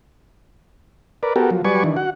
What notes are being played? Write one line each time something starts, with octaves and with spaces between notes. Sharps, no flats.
A#4 B4 D5
B3 F#4 G4 A4 A#4
F3 F#3
F#3 G3 B4 D5 G#5 C#6
D#3 E3 D4
F#4 F#5